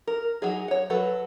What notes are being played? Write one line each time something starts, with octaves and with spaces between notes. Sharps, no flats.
A#4
F#3 D#4 G#4
C#5 F#5
F#3 F#4 A4 B4